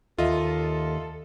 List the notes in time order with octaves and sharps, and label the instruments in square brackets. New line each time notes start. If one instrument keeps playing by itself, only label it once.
[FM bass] D#2 [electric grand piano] F4 D#5 E5 [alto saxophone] A4